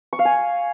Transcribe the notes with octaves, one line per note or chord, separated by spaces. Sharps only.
C#6
F5
G#5